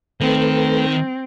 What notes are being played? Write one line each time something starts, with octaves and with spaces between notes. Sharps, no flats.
D#3 A3 C4 A4 B4